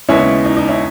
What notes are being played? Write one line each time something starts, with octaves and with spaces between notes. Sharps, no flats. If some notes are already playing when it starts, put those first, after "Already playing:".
D#2 C#3 G#3 B3 C#4 E4
D#4
D#4
C#4 E4